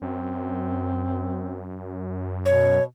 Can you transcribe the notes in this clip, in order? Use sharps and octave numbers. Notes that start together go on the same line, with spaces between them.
F#2 C4
B2 C#5